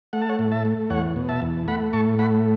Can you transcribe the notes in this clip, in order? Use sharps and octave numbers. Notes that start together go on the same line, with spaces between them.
A3 F#5
A5
C#5 F#5
A2
E5 A5
A3
E2 C#5 F#5
B2
E5 A5
E2
A3 F#5 B5
A2 A5 C#6
A3 F#5 B5